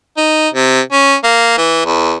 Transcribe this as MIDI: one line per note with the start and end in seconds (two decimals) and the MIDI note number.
0.17 0.49 63
0.54 0.81 48
0.93 1.15 61
1.24 1.54 58
1.58 1.85 52
1.85 2.16 40